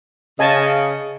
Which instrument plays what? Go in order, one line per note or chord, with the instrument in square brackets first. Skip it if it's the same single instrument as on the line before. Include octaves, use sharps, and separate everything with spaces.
[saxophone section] C#3 [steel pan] D#5 G#5 A5